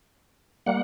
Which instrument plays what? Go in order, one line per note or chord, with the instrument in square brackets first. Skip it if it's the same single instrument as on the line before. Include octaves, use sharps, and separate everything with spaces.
[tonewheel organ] G3 A#3 F#5